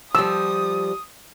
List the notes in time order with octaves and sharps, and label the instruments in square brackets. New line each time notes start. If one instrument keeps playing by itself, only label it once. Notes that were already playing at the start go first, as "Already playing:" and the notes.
[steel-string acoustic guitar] F3 G3 [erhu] D#6 [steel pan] E6